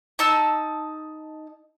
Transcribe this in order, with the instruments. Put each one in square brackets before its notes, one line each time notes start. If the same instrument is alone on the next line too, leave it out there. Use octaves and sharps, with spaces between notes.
[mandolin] D#4 A5 E6